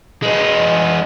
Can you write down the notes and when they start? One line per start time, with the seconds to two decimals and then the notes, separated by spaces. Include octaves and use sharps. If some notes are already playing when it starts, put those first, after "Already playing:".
0.22 G#3 B3